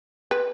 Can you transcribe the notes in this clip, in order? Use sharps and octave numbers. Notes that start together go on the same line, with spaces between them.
B4